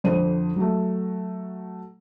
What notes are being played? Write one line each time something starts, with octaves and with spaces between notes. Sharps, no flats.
F2 D3 C5 D#7
F#3 A3